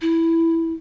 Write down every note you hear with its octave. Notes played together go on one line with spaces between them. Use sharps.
E4